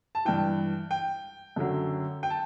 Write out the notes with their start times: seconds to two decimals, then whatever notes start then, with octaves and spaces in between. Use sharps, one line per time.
0.15 A5
0.25 G2 E3 G5
0.91 G5
1.56 F#2 D3 F#3
2.23 G5
2.30 A5